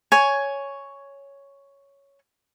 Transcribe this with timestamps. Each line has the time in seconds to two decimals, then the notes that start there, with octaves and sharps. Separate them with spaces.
0.12 C#5 G#5